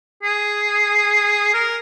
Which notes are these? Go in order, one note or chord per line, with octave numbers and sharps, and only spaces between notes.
G#4
A#4